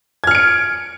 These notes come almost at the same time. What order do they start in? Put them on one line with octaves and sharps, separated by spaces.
G#6 F6 C#7 D7